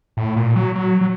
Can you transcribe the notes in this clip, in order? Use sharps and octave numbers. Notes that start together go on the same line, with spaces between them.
A2
A#2
F#3
F#3
F#3